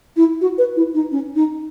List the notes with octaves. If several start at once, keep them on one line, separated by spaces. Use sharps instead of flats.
E4
F#4
B4
E4
D#4
C#4
D#4